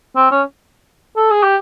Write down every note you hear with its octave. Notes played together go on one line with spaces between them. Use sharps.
C4
C#4
A4
G#4
G4